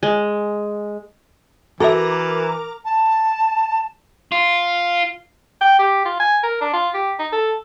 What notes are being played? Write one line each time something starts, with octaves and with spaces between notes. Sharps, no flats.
G#3
E3 F#4 A4 A#4 E5 A#5 D6
A5
F4
G5
G4
F4
G#5
A#4
D4
F4
G4
D#4
A4